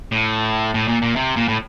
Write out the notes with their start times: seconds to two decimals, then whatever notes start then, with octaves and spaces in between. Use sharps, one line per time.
0.12 A2
0.74 A2
0.88 A#2
1.02 A#2
1.16 C3
1.36 A#2
1.48 A2